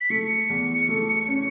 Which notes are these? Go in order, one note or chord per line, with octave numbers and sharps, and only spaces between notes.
B6
A3 C#7
E2
A3
C#4